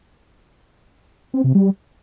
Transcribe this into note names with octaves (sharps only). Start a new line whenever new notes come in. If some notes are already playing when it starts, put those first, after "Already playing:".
C4
C3
G3